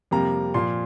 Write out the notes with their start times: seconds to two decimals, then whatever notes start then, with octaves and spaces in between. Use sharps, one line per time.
0.11 F2 C3 G3 A#3 A#5
0.54 A#2 F3 A#3 C6